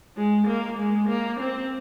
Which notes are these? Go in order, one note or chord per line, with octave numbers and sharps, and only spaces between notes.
G#3
A#3
G#3
A#3
C4